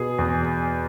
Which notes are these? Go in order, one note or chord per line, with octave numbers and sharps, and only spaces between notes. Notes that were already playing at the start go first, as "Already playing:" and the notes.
Already playing: B2 B3 G#4
E2